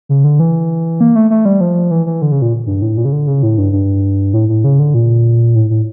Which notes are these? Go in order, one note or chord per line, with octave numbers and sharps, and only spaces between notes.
C#3
D3
E3
A#3
A3
A3
G3
F3
E3
E3
D3
C#3
A#2
G2
A2
A#2
C#3
D3
C#3
A2
G2
G2
A2
A2
C#3
D3
A#2
A2
A2